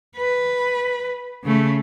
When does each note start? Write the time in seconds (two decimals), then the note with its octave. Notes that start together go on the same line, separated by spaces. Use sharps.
0.16 B4
1.44 C#3 A3